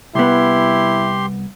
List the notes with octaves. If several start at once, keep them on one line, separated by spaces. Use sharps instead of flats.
C2 B3 E4 G4 C6